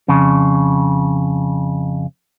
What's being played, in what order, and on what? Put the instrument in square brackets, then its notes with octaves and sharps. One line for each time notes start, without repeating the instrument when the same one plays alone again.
[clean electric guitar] F2 C#3